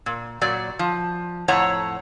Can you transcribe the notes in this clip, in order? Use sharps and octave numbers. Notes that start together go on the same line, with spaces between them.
A#2
A#2 F#3 D5
F3
F2 A2 C#5 F#5 A#5